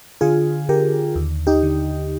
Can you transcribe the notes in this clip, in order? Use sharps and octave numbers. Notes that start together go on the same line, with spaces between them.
D3 F4 G#4
D3 G4 A#4
D#2
D#4 G4
D3